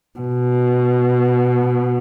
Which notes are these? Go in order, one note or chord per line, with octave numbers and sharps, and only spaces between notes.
B2